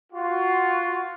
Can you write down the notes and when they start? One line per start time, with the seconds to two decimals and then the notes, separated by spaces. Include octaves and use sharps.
0.13 F4 F#4